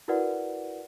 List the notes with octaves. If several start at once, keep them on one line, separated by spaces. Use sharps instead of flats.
E4 F#4 A#4 B4 D5 F#5